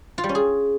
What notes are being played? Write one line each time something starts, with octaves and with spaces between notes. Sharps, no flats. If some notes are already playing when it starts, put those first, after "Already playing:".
F4
G3
C#4
G#4